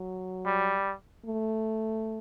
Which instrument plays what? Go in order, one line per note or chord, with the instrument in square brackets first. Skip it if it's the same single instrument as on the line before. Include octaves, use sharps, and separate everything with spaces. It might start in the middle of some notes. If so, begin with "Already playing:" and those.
Already playing: [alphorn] F#3
[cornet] G3
[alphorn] A3